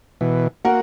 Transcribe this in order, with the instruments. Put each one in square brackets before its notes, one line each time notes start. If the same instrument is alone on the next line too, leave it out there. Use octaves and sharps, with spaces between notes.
[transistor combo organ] B2 E3
[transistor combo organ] A#3 F#4 [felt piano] A#4 F#5